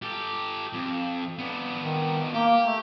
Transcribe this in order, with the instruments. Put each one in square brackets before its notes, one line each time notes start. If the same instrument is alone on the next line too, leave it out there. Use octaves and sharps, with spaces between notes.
[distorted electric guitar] G4 A4
F2
B3 D4
[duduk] D#3
[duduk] A#3 [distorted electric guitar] G4
[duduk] A3